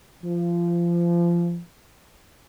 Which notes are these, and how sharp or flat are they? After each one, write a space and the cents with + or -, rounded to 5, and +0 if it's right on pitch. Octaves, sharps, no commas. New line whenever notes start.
F3 -25